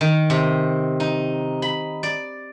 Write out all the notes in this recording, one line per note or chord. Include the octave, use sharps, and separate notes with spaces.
D#3
C3
D#4
B5
D5